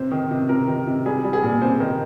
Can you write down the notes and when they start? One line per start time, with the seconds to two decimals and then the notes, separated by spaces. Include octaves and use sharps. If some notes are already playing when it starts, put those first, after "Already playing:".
Already playing: C3 C5
0.12 D#3
0.31 C3
0.49 C3 A#4
0.68 D#3
0.87 C3
1.05 G3 G#4
1.24 G3
1.33 G#4
1.43 A#2
1.62 C3 C5
1.80 D#3 A#4